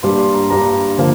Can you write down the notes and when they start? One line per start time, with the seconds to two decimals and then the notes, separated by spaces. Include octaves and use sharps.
0.03 G2 G3 A#3 D4 C6
0.18 C6
0.34 A#5
0.50 G2 G3 A#3 D4 A#5
0.97 D3 F3 A#3